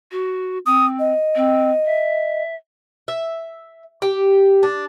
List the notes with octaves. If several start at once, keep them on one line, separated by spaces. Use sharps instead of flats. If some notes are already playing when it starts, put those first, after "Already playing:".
F#4
C4 D#6
D#5
C4
E5
E5
G4
D4